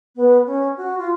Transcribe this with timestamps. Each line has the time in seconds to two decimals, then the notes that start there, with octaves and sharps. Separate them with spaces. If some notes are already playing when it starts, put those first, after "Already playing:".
0.16 B3
0.46 C#4
0.77 F#4
0.98 F4